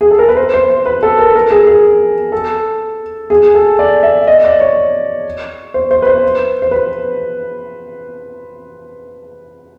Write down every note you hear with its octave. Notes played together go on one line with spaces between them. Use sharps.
G#4
A4
A#4
B4
C5
C5
C5
B4
A4
A#4
A#4
G#4
G#4
A4
G#4
A4
D5
E5
D#5
D5
C#5
C5
C5
B4
C5
C5
B4